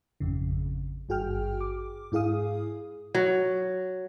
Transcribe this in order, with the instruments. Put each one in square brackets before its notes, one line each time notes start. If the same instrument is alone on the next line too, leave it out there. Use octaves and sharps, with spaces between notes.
[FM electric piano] G#1 F2 C#3
G#1 G2 F#4 G#4 G5 F6
D6
G#2 E4 G#4 F5 D#6
[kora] F#3